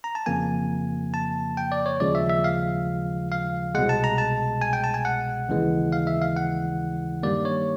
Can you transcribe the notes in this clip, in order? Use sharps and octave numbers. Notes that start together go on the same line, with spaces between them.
A#5
A5
F2 C#3 F3 A#3 G#5
A5
G5
D5
C#5
D#2 C#3 F3 G#3 D5
E5
E5
F5
F5
C2 B2 G#3 F#5
A5
A#5
A5
G#5
G5
A5
G#5
F#5
D#2 C#3 E3 G#3
F5
E5
F5
F#5
G2 D#3 G3 A#3 D5
C#5